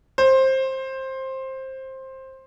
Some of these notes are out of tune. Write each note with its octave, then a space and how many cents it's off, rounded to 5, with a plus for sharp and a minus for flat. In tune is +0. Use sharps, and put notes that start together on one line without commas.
C5 +15